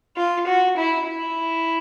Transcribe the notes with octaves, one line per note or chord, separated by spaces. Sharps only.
F4
F#4
E4
E4